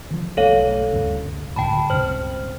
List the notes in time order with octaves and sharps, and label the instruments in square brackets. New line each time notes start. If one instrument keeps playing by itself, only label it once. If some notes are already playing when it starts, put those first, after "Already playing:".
[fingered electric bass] C#3 E3 F3
[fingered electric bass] B1 A3 [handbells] A4 C#5 F5
[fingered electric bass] D2 G2 C#3
[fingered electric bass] C#2 A2 D3 [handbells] G5 A5 B5
[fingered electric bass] C#2 G2 C3 [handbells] C5 F6